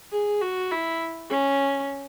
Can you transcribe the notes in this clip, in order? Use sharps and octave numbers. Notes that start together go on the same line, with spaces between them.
G#4
F#4
E4
C#4